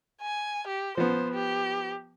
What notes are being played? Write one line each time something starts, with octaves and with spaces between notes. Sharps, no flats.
G#5
G4
F3 B3 C5
G4